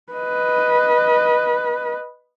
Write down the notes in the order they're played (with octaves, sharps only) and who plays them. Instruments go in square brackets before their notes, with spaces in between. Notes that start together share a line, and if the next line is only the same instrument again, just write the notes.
[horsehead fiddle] B4 D#5